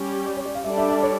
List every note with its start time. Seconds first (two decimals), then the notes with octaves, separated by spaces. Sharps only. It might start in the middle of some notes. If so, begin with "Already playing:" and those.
Already playing: G3 C#4 G4
0.27 D5
0.37 C#5
0.46 D5
0.55 F5
0.64 G3 D4 A4 D5 E5
0.78 E5
0.90 E5
1.03 C#5